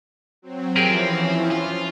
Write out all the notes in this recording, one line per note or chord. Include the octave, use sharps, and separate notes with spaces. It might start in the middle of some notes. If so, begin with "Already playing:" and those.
F#3 C4
E3 F3 C4 C#4 G4 G#4 A#4
F4